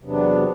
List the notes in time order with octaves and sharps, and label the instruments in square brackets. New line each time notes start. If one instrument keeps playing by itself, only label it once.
[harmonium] E2 C3 F#3 B3 D4